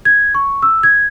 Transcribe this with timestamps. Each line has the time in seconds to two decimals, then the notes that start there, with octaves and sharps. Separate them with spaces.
0.05 G#6
0.35 C#6
0.62 E6
0.83 G#6